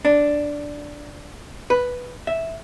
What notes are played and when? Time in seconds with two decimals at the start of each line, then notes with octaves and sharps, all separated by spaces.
0.05 D4
1.70 B4
2.27 E5